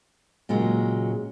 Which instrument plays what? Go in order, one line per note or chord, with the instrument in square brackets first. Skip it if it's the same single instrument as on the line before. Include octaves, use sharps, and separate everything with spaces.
[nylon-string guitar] A#2 C#3 F#3 G#3